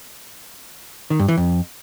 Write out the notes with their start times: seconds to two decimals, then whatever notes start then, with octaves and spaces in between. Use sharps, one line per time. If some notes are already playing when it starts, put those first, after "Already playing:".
1.10 D#3
1.19 G2
1.28 E3
1.38 F2